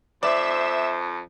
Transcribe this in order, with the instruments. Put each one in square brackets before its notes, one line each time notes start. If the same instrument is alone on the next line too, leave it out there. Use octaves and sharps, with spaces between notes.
[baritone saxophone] F2 [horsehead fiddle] C5 [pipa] D5 [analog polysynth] E5 E7